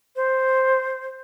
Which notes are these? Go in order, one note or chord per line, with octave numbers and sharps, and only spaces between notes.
C5